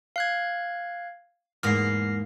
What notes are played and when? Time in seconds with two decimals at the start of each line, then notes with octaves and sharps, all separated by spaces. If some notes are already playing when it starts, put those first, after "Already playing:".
0.16 F5 F#6 G#6
1.63 E2 G#2 A#3 F6 A#6 C7